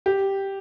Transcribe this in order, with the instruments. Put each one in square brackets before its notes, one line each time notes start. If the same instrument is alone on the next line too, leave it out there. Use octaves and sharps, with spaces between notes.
[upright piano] G4